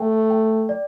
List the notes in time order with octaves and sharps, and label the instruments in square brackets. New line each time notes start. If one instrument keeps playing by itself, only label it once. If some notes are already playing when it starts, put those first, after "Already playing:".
Already playing: [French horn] A3 [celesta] G5
[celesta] G5
D5